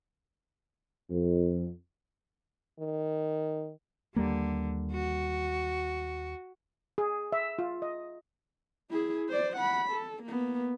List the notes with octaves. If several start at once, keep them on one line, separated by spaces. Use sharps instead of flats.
F2
D#3
D#2 D3 G3 A#3
F#4
G#4
E5
F4
D#5
E4 G#4
C5 D5
F#5 B5
A4
A#3 B3